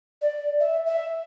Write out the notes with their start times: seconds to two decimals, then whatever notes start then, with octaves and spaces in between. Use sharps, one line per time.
0.22 D5
0.60 E5
0.86 E5